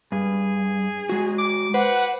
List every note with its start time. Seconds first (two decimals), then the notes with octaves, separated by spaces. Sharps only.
0.12 G2 G#4
1.09 G#3 F#4
1.39 D6
1.74 B4 C5 F#5